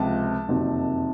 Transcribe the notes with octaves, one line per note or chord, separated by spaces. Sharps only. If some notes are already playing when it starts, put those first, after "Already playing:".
Already playing: C#2 C3 F3 A5
F#1 F2 C3 D#3 F#3